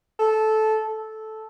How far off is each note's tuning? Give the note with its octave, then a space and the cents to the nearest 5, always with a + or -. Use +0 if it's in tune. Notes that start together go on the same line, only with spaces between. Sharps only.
A4 -15
A4 -10